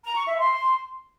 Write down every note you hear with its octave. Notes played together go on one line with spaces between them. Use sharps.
A#5
C#6
E5
C6